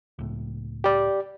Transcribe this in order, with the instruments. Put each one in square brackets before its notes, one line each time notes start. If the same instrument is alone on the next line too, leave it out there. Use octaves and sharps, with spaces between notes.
[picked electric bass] C#2 A2
[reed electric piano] G4 D5